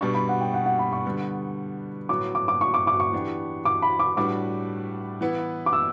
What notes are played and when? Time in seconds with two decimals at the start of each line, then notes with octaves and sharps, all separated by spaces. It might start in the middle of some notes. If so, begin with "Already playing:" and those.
0.01 B2 G3 D4 F#4 C#6
0.14 B5
0.29 F#5
0.41 G5
0.54 F#5
0.66 F#5
0.79 B5
0.92 C#6
1.06 D3 G3 B3
2.09 A2 F#3 B3 F#4 D6
2.35 D6
2.48 D6
2.61 C#6
2.74 D6
2.87 D6
3.00 C#6
3.13 E3 B3 D4 G4
3.65 D6
3.82 B5
3.99 D6
4.17 A2 G3 D4 F#4 B4 D6
5.21 E3 B3 E4 B4
5.66 D6
5.73 E6